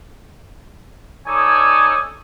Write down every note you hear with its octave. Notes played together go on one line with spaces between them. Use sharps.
D#4 A4 C#5 D5 G#5 D#6